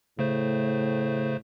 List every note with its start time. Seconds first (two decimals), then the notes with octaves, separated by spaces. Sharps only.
0.19 A2 C#3 A3 C5